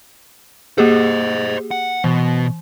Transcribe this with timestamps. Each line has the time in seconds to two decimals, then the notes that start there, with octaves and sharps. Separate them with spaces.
0.78 A#3 G4 G#4 C5 D#5
1.71 F#5
2.04 B2 E3